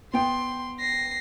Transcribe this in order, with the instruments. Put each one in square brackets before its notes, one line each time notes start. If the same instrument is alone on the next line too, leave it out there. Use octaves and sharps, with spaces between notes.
[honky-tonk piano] B3 G5 [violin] C6
[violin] A#6 C7